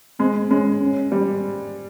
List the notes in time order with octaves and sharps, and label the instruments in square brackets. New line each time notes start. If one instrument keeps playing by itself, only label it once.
[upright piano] G#3 [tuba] C4
[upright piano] G#3 [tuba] C#4
[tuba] C#4
[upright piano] G3